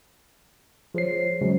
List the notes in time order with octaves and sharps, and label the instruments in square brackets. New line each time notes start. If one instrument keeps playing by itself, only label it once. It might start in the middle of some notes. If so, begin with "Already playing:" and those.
[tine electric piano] F3 C7 [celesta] G#4 C5 C#5
[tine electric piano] C#3 F#3 G#3